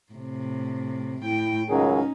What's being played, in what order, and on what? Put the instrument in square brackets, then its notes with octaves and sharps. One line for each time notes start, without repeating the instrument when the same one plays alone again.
[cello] A2 C3
[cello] A2 G5 [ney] E4
[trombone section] C#2 D#3 F#3 [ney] C#4 [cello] D#4 [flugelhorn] G#4